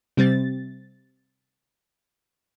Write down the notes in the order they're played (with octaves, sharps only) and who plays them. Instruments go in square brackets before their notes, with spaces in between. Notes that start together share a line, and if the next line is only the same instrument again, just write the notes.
[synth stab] C3 G3 C4 A6